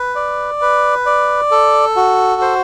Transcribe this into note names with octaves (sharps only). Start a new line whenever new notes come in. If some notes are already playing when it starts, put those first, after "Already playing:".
Already playing: B4
D5
B4
D5
A4
F#4
C5